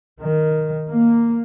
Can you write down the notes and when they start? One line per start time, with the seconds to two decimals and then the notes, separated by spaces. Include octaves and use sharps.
0.21 D#3
0.89 A#3